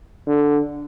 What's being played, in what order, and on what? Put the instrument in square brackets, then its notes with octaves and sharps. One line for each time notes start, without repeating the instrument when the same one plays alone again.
[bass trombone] D3